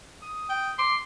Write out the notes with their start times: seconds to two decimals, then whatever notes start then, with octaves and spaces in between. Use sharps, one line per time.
0.22 D#6
0.50 G5
0.78 C6 D6